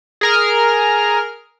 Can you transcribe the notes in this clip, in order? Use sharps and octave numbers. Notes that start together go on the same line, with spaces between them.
G#4 A#4 F6